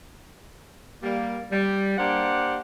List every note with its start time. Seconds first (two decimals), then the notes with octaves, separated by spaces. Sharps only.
1.03 G3 A#3
1.52 G3
1.98 A#3 D4 G4 C5 F#5